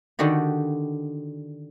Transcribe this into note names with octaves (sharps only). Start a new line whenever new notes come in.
D3 D#3 D4 F#4 G4